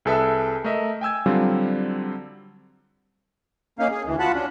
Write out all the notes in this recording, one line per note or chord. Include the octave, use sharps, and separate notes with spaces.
C2 G#4 A4 B4 E5
A3 A#4 D#5 E5
G5 G#5 E6 G#6
D3 F#3 G3 C4 F4
A#3 C#4 D#4 F5
G#4
D2 E3
F4 F#4 F#5 A5 B5
C#4 D4